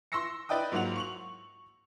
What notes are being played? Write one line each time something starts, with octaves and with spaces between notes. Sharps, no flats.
C6 C#6 E6 A#6 C#7
E4 B4 D5 D#5 G5 D#6
G#2 F#3 A#3 F4 F#5 F7
C#6 F7 F#7